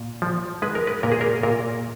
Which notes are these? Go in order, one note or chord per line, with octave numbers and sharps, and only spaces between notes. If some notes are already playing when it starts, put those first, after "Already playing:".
Already playing: A#2
F3
G#3 B4
A#4
B4
A#2 A#4
G#4
A#4
A#2 A#4